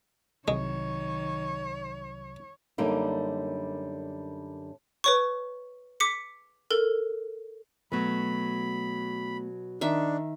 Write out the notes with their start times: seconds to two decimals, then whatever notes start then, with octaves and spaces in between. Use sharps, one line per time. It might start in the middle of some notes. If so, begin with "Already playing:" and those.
0.48 C2 C3 D#3 F#3 G#3 C#5
2.78 F#2 D3 G3 A#3 D#4
5.04 B4 C#5 C#6
6.00 D6 B6 C#7
6.71 A4 A#4
7.92 B2 F#3 A3 B3 B5
9.81 D#3 D4 E5